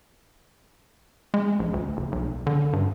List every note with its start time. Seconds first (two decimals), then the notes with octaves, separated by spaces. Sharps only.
1.34 G#3
1.59 A#1
1.74 D2
1.97 F#1
2.12 B1
2.47 D3
2.73 G2